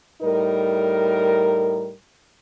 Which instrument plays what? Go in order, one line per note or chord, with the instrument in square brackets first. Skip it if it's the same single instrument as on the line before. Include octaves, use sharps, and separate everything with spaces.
[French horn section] A2 G3 D#4 A#4